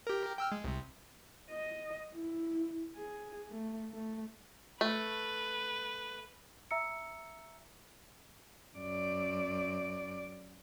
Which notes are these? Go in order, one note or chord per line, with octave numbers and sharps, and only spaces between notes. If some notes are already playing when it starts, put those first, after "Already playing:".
G4 A#4
G5 E6 F6
G#3
C2 C3
D#5
E4
G#4
A3
A3
A3 B4
E5 A#5 E6 C#7
F#2 D5